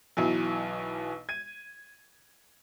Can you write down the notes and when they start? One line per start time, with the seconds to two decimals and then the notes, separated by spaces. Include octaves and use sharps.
0.17 B1 B2 E3 F#3
1.29 G#6 D#7